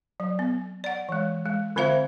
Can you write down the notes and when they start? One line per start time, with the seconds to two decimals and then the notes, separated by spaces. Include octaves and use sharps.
0.20 F#3
0.39 B3
0.84 D5 F#5
1.09 E3 G#3
1.46 G#3
1.76 D3 C4 F4 C5 E5 F5